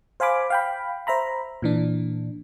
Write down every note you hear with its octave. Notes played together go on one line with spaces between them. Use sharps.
C5 F5 G#5 B5 D6
F5 G5 B5
C5 E5 A#5 B5
A#2 E3 D4